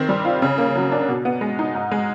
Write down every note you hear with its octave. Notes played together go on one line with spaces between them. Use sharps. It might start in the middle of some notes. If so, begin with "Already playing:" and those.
Already playing: D#3 C4
G3
F4
C#3
A#3
F#3
D4
B2
B3
G#3
D#4
G#2
G#3